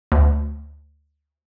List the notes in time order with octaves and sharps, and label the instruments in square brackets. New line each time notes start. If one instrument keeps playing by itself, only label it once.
[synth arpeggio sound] D2